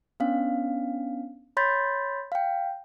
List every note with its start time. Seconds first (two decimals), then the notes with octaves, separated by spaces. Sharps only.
0.20 B3 C#4 D4 F5
1.57 C#5 B5 C6 G6 A6 B6
2.32 F5 G5